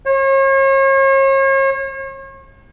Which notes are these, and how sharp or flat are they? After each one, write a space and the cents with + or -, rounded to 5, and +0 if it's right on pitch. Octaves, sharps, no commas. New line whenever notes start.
C#5 -40